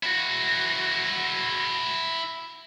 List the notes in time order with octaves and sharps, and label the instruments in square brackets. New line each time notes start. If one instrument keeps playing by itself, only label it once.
[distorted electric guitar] E4 F#4